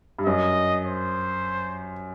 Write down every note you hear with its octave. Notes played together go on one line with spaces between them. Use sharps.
G2
F#2 D#5
C5